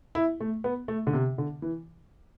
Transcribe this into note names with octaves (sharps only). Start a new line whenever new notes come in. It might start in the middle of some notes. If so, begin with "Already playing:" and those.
E4
A3
B3
A3
D3
C3
D3
E3